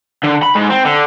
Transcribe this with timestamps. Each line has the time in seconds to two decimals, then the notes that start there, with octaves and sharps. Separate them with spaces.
0.23 D3
0.42 B5
0.55 G#2
0.70 C4
0.85 D3